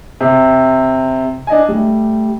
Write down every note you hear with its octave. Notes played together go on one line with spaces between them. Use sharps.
C3
D4 D#5 G#5
G3 A3